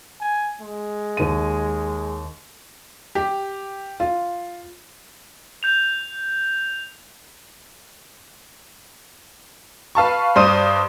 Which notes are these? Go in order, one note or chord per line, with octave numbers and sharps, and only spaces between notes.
G#5
G#3
D#2 D#7
G4
F4
G6 F7
B4 F5 A5 C#6
G2 C5 D5 C6 D#6 D#7